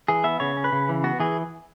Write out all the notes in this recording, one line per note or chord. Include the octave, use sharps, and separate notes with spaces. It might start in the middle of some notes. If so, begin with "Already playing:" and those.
E3 G#4
B3 E5
C#3 C#5
C#4
B4
C#3
E3
B3 F#4
E3 G#4